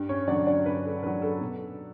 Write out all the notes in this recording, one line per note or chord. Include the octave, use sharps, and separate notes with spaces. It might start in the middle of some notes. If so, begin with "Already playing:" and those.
Already playing: G2
C#4 C#5
D3 F#3 D4 D5
D4 D5
G2 B4
A4
D3 F#3 B4
A4
B2